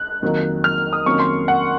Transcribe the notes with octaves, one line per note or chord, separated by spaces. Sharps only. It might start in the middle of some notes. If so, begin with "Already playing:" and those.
Already playing: F#6
F2 D#3 F#3 A#3
F6
D#6
F2 D#3 F#3 A#3 C#4 C#6
C6
F#5